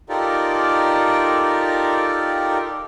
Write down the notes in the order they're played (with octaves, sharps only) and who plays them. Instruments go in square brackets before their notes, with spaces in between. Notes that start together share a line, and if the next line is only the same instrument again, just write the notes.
[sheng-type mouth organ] D#4 F4 G4 A4 A#4 D5